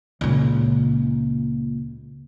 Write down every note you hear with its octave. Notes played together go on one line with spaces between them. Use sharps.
C#2 A#2